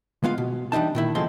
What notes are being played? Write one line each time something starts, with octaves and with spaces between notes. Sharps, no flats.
G#3 B3 F4 F5
B2
E3 G3 D4 D#4 A5
A#2 D#3 E4
D#2 C#3 F3 G#3 A4 C6